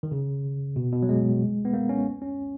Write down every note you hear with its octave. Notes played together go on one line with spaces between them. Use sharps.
D#3
C#3
B2
B2
F#3
G#3
B3
A#3
C#4
C#4